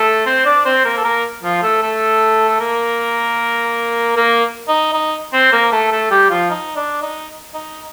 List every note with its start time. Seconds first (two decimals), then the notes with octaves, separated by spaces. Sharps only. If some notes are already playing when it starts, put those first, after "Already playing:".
Already playing: A3 A4
0.26 C4 C5
0.45 D4 D5
0.65 C4 C5
0.85 A#3 A#4
0.97 A4
1.04 A#3 A#4
1.43 F3 F4
1.63 A3 A4
1.82 A3 A4
2.49 A4
2.60 A#3 A#4
4.16 A#3 A#4
4.68 D#4
4.93 D#4
5.33 C4 C5
5.52 A#3 A#4
5.72 A3 A4
5.91 A3 A4
6.11 G3 G4
6.30 F3 F4
6.50 D#4
6.76 D4
7.02 D#4
7.54 D#4